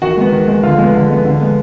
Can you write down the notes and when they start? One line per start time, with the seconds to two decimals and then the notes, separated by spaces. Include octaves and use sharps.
0.02 D#3 F#4 F#5
0.17 G#3 B3
0.32 D#3
0.48 G#3 B3
0.63 D3 F4 F5
0.78 G#3 B3
0.94 D3
1.10 G#3 B3
1.25 D3
1.41 G#3 B3